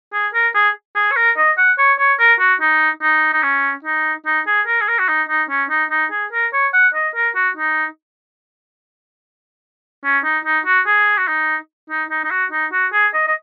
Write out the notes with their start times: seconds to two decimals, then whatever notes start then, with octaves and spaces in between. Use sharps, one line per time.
0.13 G#4
0.34 A#4
0.55 G#4
0.95 G#4
1.11 C#5
1.16 A#4
1.37 D#5
1.58 F#5
1.78 C#5
1.99 C#5
2.19 A#4
2.40 F#4
2.61 D#4
3.02 D#4
3.33 D#4
3.43 C#4
3.84 D#4
4.26 D#4
4.47 G#4
4.67 A#4
4.81 G#4
4.88 A#4
4.99 F#4
5.09 D#4
5.29 D#4
5.50 C#4
5.70 D#4
5.91 D#4
6.11 G#4
6.32 A#4
6.53 C#5
6.73 F#5
6.95 D#5
7.15 A#4
7.35 F#4
7.57 D#4
10.04 C#4
10.24 D#4
10.45 D#4
10.66 F#4
10.87 G#4
11.18 F#4
11.28 D#4
11.90 D#4
12.10 D#4
12.24 D#4
12.31 F#4
12.52 D#4
12.72 F#4
12.93 G#4
13.14 D#5
13.28 D#5